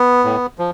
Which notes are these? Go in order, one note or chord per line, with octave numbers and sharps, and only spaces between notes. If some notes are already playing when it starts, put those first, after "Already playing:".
Already playing: B3
A2
F3